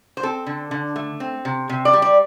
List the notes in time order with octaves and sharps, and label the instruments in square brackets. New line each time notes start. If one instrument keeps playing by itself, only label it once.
[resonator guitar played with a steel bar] C5
C4 A4
D3
D3
A3
C4
C3
C3
D5
G3
D5